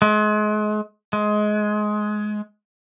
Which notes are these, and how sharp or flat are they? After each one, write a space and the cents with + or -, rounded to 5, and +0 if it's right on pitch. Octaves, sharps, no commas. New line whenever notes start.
G#3 +35
G#3 +20